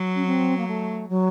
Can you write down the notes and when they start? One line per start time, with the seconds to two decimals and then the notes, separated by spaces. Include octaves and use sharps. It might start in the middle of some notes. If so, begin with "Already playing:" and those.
Already playing: F#3
0.15 C#4
0.26 C4
0.57 A#3
0.67 A3
1.09 F#3